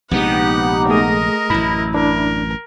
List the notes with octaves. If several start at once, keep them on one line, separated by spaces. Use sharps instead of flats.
A#1 C3 G#3 B3 D#4 G4 F#5
A3 G#4 A#4 D#5 D#6
A1 F#2 E4 B5
D4 A#4